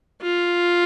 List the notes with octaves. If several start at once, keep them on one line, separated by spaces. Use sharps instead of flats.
F4